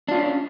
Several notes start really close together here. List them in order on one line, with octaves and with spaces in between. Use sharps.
D4 F4 C#4